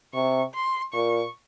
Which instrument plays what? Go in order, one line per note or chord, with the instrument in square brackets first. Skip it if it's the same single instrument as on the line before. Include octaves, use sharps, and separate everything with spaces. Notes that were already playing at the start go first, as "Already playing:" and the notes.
[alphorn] C3 [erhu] C#6
[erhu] C6
[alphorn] A#2 [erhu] C#6